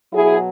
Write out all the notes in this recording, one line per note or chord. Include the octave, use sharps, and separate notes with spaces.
B2 F#3 E4 G#4